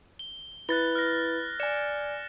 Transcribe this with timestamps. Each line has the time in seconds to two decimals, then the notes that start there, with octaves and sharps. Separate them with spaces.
0.19 G7
0.69 E4 B4 B5 F#6 A6 G7
0.95 F6 A#6
1.60 D5 G#5 C#7 E7